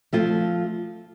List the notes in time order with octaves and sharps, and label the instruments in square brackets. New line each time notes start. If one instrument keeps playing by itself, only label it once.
[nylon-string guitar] F3 A3 C4 F4